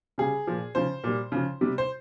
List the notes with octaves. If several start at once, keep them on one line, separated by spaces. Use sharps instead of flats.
C#3 G3 G#4
A#2 F3
C#3 F3 C5
A#2 G3
C#3 F3
C3 G3
C5